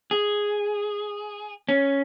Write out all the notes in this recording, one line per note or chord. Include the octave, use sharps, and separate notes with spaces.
G#4
C#4